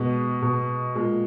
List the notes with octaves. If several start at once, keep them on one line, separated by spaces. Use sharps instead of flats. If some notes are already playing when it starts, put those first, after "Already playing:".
Already playing: B2 G#3 B3
B2
A#2 G#3